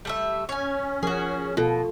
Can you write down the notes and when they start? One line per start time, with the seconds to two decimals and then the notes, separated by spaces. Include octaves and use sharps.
0.05 G3 A3 E5
0.49 C#4 C#5 G#5
1.03 F3 F#4 G#4 A#4
1.57 B2 F4 A4